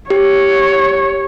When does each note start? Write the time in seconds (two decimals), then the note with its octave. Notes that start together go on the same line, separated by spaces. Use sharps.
0.10 G4 C#5